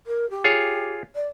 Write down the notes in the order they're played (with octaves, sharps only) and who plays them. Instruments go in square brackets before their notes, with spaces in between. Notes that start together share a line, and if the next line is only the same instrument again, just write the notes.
[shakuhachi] A#4
G4
[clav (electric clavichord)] F4 G#4 C#5
[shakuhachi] D5